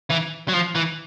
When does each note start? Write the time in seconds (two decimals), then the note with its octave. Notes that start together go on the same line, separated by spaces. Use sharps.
0.10 E3
0.48 F#3
0.53 F3
0.75 E3